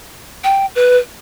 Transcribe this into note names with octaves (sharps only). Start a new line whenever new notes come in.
G5
B4